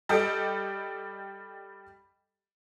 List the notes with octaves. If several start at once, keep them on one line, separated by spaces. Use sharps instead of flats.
G3 G4 A4 D#5 G5